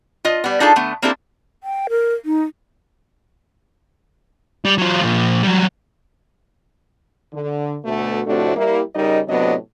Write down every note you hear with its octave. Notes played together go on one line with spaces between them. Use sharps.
F4 D#5
G3 B3
D4 D#4 F4 G#4 A4
D3 A3 B3
A#3 C4 D4 E4 G4 A4
G5
A#4
D#4
G3
F#3 F4
A#2 F3
F#3 G3
D3
D2 B2 A3
F2 A2 C3 A3 D4 F#4
G3 A#3 E4
C#3 G3 D#4 A#4 D#5
A2 C3 F#3 B3 D4 D#5